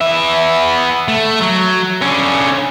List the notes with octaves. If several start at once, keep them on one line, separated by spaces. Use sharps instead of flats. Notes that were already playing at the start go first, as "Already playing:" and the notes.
B3 E5
A3
F#3
D3 C#4